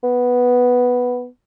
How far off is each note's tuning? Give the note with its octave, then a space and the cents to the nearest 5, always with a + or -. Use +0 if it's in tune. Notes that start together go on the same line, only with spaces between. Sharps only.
B3 +0